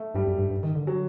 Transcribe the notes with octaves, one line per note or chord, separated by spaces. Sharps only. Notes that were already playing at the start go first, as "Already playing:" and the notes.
Already playing: A3
G2 G3
F#2
G2
G2
D#3
D3
F#3